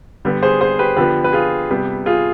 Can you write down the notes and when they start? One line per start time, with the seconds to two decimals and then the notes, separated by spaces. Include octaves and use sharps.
0.25 D3 G3 B3
0.43 G#4 C5
0.61 G#4 C5
0.79 G4 B4
0.96 D3 F3 B3 G4 B4
1.24 B4
1.33 F4 G#4
1.69 C3 G3 B3
2.06 F4 G#4